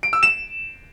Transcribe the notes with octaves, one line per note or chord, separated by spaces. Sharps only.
D7
E6
E7